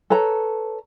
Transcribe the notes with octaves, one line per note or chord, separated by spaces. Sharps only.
A4 B4 C#5 A#5